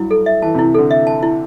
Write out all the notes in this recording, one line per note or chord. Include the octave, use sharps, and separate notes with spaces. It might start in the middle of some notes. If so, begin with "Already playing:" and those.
Already playing: G2 F#3 E4
A4
E5
E3 A5
C3 E4
D3 A4
E5
A5
E4